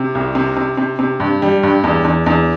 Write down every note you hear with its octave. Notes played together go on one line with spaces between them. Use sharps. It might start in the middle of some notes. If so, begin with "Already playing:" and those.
Already playing: C3
C2
C3
C3
C3
C3
G2
G3
G2
E2
E2
E2